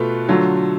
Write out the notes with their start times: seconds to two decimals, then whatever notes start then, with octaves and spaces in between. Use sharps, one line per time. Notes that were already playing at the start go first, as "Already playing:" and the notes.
Already playing: B2 A3 F4 B4
0.29 D3 F#3 A3 F4 A4